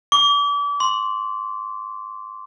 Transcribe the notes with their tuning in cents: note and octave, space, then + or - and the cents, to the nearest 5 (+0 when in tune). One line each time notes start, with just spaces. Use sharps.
D6 -35
C6 +0